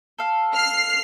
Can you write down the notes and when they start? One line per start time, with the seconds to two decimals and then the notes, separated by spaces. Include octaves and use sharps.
0.18 A4 F5
0.55 F6 C7